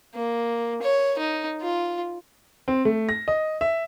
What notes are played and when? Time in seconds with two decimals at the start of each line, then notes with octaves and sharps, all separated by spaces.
0.14 A#3
0.82 C#5
1.18 D#4
1.61 F4
2.68 C4
2.85 A3
3.09 A#6
3.28 D#5
3.61 E5